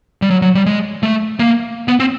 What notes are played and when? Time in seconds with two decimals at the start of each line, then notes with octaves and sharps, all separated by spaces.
0.22 G3
0.30 F#3
0.42 F#3
0.55 G3
0.66 G#3
1.03 A3
1.39 A#3
1.88 B3
2.00 C4